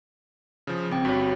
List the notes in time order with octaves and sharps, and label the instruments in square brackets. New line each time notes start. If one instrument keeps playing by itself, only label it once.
[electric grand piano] C#3 F3
[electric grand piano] G#1 [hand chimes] C4 G5
[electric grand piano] G1 G2 [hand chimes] F#4 C#5